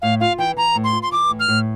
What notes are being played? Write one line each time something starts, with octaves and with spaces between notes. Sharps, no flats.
A2 F5
F4 F5
E3 G5
E3 A#5
A2
C6
F4
C6
E3 D6
A2
F6
A2